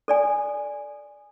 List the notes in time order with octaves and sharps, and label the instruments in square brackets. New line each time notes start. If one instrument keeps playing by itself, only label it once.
[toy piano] A4 D5 G#5